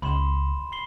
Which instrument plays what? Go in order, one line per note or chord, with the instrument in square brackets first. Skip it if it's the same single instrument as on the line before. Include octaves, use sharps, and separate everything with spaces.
[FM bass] C#2 [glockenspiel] B5 C6 E7
[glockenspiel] B5 C7 G7